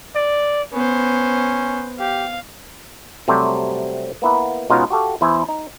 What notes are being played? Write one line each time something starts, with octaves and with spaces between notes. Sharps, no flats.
D5
B3 C#4 C5
G4 F5
C3 F#3 G3 A3 C4 G4
A#3 B3 E4 E5 F#5
B2 G#3 B3 C#4 D#4 F4
F#4 G4 A4 F5
E2 E4 C5 G#5
D#4